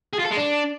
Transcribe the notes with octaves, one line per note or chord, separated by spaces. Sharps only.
G#4
F4
A4
G#3
D4